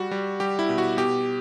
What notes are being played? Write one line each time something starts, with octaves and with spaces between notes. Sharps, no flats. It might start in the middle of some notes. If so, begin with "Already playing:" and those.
Already playing: G3 F#4
G3
G3 G4
E4
B2
F#4
B2 G4